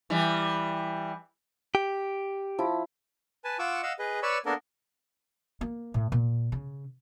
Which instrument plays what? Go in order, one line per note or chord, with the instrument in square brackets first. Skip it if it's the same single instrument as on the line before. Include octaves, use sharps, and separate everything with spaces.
[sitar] E3 G3
[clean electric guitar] G4
[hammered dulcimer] F3 E4
[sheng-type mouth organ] B4 G#5 A5
F4 F#5 C#6 D6 E6
D#5 F5 F#5 E6
G#4 B4 D#5
B4 C#5 D5 B5 C#6 E6
A#3 B3 D4 A4 A#4
[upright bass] A#3
A2
A#2
C#3